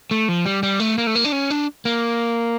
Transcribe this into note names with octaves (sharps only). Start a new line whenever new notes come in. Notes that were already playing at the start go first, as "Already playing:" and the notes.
A3
F3
G3
G3
A3
A#3
A3
A#3
D4
C#4
D4
A#3